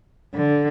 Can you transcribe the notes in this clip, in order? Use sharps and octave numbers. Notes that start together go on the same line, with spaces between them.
D3